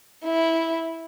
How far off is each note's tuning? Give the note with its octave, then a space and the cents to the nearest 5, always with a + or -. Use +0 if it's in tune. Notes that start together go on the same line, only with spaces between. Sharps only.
E4 -10